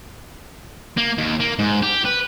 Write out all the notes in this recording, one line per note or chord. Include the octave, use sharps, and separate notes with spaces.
A#3
D#2
A#3
G#2
G4
B4